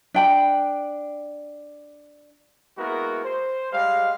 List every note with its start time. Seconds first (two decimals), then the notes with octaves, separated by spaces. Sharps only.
0.14 D4 G5 B5
2.78 G#3 A#3 B3 E4 F#4 A#4
3.25 C5
3.72 G3 G#3 F5